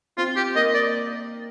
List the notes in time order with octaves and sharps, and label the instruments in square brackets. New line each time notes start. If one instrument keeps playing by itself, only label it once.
[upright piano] C4 [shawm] F4
[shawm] G4
[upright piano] A#3 [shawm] D#5
[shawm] D5